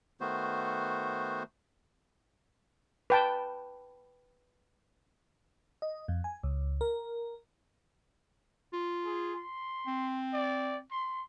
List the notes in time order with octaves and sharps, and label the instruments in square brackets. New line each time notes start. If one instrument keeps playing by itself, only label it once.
[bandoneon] D#3 A3 B3 F#4 C5
[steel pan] B4 G5 A5
[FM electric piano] D#5
F2
G#5
C#2
A#4
[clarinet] F4
[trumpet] G#4
C6
[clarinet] C4
[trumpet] D5
C6